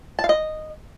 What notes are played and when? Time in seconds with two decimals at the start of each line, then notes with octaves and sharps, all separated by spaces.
0.19 A5
0.24 F5
0.29 D#5